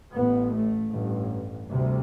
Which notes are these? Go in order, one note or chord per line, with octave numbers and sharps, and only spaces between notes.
A1 A2 B3
A3
A1 G2
D2 C3 G3